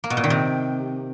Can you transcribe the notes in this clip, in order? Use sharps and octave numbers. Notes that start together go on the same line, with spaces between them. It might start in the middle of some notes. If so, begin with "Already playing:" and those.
A#3
B2
A#2
D#3
C3